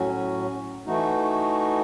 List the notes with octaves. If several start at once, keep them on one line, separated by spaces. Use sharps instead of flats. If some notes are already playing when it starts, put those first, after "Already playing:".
Already playing: A2 F#3 C#4 F#4
E3 A3 D#4 F#4